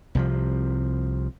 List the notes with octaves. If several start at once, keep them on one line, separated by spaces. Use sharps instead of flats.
C2 C3 F3